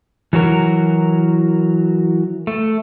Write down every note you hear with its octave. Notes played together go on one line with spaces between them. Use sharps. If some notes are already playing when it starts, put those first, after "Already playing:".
E3 F#3 F#4 A#4
A3